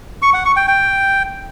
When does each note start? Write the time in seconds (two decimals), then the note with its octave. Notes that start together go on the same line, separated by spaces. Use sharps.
0.22 C#6
0.34 F#5
0.45 C#6
0.56 G5
0.68 G5